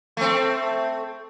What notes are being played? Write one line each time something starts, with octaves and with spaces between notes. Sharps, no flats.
A3 C4